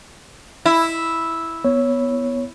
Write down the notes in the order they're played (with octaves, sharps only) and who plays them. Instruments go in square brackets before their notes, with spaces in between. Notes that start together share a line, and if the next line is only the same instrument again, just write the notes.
[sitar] E4
[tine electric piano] B3 C#5